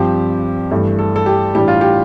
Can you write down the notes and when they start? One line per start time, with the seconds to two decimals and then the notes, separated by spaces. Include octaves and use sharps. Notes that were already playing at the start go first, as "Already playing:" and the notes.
Already playing: G2 F3 C4 G4
0.71 G2 E3 A3
0.99 A4
1.16 A4
1.26 G4
1.55 A2 E3 G3 D4 G4
1.68 F4
1.81 G4